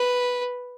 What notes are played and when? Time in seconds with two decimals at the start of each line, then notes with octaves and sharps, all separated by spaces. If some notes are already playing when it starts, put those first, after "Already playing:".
Already playing: B4